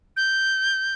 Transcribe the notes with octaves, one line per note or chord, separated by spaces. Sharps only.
G6